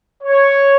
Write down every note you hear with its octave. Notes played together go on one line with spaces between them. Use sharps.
C#5